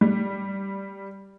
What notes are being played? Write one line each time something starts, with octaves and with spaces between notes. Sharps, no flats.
G3